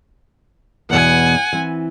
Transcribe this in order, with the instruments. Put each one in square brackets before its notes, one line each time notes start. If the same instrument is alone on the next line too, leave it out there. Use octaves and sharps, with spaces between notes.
[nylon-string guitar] E2 B2 E3 [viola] F#5 G#5
[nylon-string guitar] E3 C4